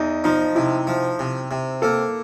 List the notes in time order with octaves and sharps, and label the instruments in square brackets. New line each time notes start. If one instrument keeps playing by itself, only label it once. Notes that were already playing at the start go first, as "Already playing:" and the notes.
Already playing: [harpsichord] E2 [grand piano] D#4
[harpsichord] F3 [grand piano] D#4
[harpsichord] C3 [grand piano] E4
[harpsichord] F3
C3
C3
[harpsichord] A#3 [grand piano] A4